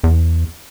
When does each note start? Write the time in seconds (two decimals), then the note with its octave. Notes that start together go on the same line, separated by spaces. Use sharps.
0.04 E2